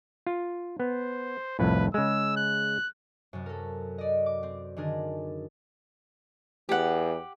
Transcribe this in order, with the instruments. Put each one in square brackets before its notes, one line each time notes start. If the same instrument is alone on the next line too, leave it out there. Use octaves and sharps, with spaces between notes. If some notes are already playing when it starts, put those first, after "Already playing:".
[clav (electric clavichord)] F4
[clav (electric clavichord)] B3 [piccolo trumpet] C5
[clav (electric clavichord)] C2 F2 A2 [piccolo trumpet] B4
[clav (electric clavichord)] C#3 G#3 [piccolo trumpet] E6
[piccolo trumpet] F#6
[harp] F#2 C3
A4 A#4
D5 D#5
D6
C4
D3 D#3 D4 G#4 A#4
[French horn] E2 [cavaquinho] G4 F#5